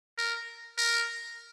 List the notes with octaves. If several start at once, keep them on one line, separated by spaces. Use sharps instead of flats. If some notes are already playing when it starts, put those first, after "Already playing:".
A#4
A#4